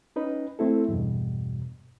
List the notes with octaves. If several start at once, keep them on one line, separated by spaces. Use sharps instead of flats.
C#4 D#4 B4
A3 C4 E4 A4
E2 G2 B2